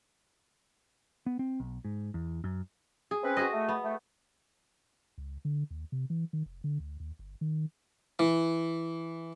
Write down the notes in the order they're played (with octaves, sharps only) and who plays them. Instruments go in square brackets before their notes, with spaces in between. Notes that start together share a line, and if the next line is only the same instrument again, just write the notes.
[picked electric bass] B3
C4
B1
G#2
E2
F#2
[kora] G#4
[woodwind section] C4 C#4 B4
[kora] F#4 G#4 D#5
[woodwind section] A3
[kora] B3
[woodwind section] A3
[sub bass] C#2
D3
D#2
C3
E3
D#3
F1
D3
D2
D#2
G1
D#3
[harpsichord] E3